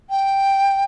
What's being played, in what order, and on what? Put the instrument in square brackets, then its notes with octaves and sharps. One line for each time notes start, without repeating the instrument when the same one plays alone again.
[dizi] G5